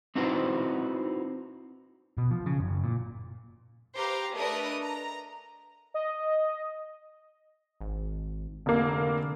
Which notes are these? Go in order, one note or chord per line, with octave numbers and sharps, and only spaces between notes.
C4 D#4 E4 F#4 B4 C5
B2
F3
C#3
F#1
A#2
G4 B4 C5 F5 A#5
A3 D4 A#4 B4 D#5 D#6
A#5
D#5
G#1
F1 D3 A#3